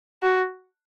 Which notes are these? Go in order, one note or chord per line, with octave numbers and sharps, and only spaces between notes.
F#4